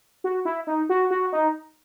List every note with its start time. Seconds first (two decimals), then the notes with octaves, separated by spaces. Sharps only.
0.24 F#4
0.45 E4
0.67 D#4
0.89 F#4
1.11 F#4
1.32 D#4